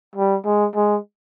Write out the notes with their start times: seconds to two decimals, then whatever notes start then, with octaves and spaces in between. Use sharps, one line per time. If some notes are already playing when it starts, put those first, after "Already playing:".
0.16 G3
0.45 G#3
0.76 G#3